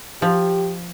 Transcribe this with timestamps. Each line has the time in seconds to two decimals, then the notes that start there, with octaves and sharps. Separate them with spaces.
0.22 F3 G4